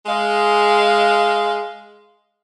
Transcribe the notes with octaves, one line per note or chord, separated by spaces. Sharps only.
G#3 F5